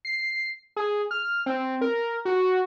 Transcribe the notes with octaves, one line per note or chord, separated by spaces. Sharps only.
C7
G#4
F6
C4
A#4
F#4